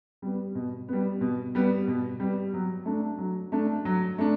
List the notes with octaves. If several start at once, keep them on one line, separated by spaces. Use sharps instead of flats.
G3 B3
B2
G3 B3
B2
G3 B3
B2
G3 B3
F#3
A3 D4
F#3
A3 D4
F#3
A3 D4